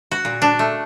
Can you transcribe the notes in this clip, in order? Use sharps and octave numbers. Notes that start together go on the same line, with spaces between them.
F#4
A#2
D4
A3